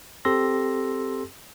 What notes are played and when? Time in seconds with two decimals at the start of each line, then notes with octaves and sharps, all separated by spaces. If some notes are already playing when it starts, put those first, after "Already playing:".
0.25 C4 G4 A4 C6 E6 A#6